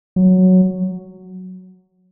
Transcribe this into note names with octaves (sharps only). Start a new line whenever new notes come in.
F#3